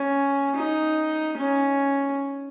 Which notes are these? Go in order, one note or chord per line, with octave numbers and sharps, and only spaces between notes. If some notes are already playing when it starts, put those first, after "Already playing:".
Already playing: C#4
D#4
C#4